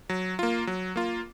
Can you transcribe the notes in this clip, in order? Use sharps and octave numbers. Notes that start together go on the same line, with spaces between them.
F#3
A#3 F4
F#3
A#3 F4